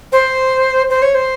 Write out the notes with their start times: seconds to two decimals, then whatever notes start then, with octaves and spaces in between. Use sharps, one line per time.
0.12 C5
0.90 C5
1.02 C#5
1.15 C5